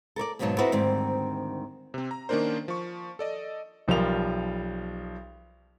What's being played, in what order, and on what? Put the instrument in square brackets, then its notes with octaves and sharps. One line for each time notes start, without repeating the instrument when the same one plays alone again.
[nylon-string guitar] A4 A#4 C#5 D5
D#2 G#2 B2 F#3 D#4 A5
C4 D#4 E4 F#4 A4 B4
D2 G#2 D#3 G3 C4
[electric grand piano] C3 C4
A#5
D#3 A#3 C#4 D4 A#4 C5
F3 C#6
A4 D5 D#5
[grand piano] B1 F3 G3 A#4 F7